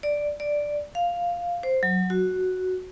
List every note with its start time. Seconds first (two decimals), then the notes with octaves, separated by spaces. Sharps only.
0.03 D5
0.40 D5
0.95 F5
1.63 C5
1.83 F#3
2.10 F#4